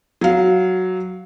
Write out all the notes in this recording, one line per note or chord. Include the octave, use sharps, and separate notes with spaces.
F#3 F5